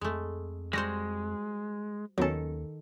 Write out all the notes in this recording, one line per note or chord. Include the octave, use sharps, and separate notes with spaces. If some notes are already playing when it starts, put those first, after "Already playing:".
F2 G#3 A3
G3 G#3 F#4 C5 A#6
D#2 D#3 F#3 B3 C#4 A4